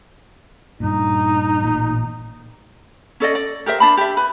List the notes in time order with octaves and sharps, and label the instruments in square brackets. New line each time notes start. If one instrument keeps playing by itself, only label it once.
[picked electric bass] G2 A#2 [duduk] D#4
[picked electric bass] A1 A#2
[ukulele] C#4 A4 D5 D#5
D5
G4 A#4 C5 E5
D4 A5 B5
G4 E5
B4 B5